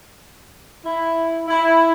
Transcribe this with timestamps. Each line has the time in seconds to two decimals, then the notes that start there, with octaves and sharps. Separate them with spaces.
0.85 E4
1.48 E4